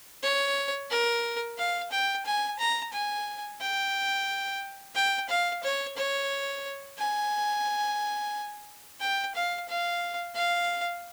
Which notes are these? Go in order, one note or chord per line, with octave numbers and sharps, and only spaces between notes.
C#5
A#4
F5
G5
G#5
A#5
G#5
G5
G5
F5
C#5
C#5
G#5
G5
F5
F5
F5